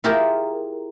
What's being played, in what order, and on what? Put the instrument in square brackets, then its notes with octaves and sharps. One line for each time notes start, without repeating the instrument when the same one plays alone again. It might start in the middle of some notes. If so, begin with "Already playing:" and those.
[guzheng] E4 F4 G4 G#4 A#4